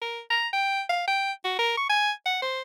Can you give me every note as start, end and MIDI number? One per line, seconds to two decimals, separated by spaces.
0.02 0.21 70
0.30 0.48 82
0.53 0.82 79
0.89 1.05 77
1.08 1.32 79
1.44 1.56 66
1.59 1.75 70
1.77 1.86 85
1.89 2.12 80
2.26 2.41 78
2.42 2.62 72